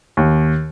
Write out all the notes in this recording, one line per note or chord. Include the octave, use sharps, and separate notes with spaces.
D#2